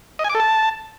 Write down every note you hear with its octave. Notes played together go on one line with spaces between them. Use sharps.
D#5
G#5
D6
A4
A5